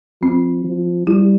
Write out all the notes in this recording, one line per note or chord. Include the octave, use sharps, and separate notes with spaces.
F3 C4
F3
G3 E4